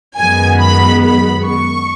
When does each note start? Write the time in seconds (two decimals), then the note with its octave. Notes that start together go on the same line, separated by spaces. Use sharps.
0.17 F#2 D#3 G#3 B3 G#5
0.60 B5
1.01 B5
1.45 C#6